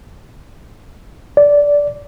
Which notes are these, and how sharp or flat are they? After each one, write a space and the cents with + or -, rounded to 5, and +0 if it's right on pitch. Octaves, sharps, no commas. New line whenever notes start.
D5 -15